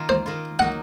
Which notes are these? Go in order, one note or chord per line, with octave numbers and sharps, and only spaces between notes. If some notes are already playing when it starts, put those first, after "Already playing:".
Already playing: D#3 A#3 F4
C5
D#3 A#3 F4
F#3 A#3 D#4 F#5